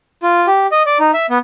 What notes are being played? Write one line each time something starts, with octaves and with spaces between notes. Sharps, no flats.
F4
G4
D#5
D5
D#4
E5
B3